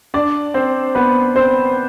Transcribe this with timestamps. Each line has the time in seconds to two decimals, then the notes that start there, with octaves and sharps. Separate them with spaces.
0.14 D4 D5
0.54 C4 C5
0.95 B3 B4
1.36 C4 C5